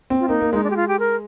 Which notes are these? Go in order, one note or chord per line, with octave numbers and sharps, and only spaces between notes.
C4
F4
A#3 D#4
A#3
G#3 D#4
D4
G4
F4
G4
A#4